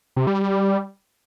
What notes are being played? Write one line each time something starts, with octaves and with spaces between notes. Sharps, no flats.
C3
G3
G3